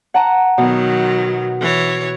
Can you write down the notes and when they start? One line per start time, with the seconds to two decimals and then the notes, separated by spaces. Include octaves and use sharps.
0.14 F#5 A5 A#5
0.58 B2 D#3 F#3
1.61 E3 C#5